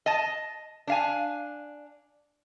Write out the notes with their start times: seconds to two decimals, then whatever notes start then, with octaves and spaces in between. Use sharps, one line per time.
0.06 D#5 A5
0.87 D4 F5 G#5